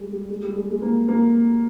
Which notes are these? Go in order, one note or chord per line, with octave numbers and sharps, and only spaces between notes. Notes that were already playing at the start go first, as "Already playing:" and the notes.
Already playing: G3 G#3
G3
G#3
G3
G#3
G#3
A#3
A#3